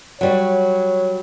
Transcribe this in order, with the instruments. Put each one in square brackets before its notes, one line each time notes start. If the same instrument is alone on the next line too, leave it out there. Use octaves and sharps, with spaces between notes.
[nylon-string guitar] F#3 G3 [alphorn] C#5